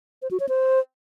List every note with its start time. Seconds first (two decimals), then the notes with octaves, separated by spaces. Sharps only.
0.22 C5
0.31 F#4
0.40 C#5
0.49 C5